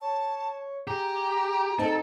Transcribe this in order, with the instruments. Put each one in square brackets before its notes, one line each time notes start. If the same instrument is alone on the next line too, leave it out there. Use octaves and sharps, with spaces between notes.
[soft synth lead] C#5 [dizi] A5
[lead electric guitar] G4 [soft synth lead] G#4 [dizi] A#5
[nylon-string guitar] C4 D#4 [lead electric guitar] A4 A5